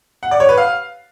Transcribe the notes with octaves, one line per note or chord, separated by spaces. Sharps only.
F#5
D5
C#5
B4
F5